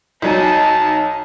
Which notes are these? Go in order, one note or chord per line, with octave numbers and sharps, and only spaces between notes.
B1 F#3 D#4 G#5 A5